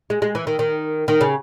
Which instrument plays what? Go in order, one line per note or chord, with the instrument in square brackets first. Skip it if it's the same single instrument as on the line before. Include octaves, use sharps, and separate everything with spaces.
[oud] G#3
G#3
E3
D#3
D#3
D#3
C#3